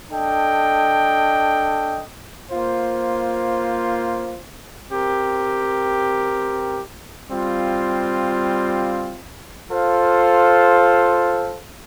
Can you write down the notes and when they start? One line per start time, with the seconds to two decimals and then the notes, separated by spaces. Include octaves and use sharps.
0.11 D4 A4 D#5 G5
2.51 A#3 F4 C5
4.90 C4 G4 A#4
7.30 G3 C4 F4
9.69 F4 A4 C5 F5